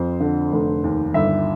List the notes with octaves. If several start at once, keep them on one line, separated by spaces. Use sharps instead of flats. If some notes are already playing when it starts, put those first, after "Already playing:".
Already playing: F2 C5
D3
F1
D#2
G1 E5